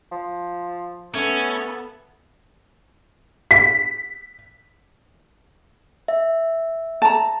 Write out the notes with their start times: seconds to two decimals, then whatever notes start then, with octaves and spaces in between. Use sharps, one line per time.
0.12 F3
1.15 A3 B3 C#4 A4
3.51 B6
6.08 E5
7.02 A5 A#5